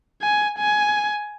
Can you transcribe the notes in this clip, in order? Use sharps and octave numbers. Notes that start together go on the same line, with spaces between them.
G#5
G#5